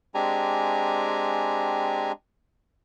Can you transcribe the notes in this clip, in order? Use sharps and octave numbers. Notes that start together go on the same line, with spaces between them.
G#3 C4 D4 G4 G#5 A#5